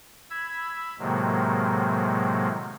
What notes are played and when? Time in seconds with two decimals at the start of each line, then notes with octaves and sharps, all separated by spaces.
0.30 B5 E6 G#6
0.99 A2 C3 D#3 F#3 G#3 A#3